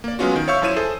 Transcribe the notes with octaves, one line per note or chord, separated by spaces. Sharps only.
A#3 D5
F#3 G#3 B3 C#4 F4 F#4
D#3
C#5 E5 F5 C#6 E6 G6
F#2 F3 E4 C#5 D#7 E7
G#4 A4 C5 E5